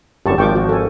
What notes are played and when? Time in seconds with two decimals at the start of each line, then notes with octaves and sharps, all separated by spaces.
0.26 G1 F#2 G4 A5 C#6
0.38 G#1 F3 G5 C#6 D6
0.55 F#4
0.69 A4 G#5